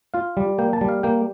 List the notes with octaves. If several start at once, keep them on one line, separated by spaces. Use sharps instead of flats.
F4 F5
G3
A#3 G5
A5
G3
F5
A#3 G5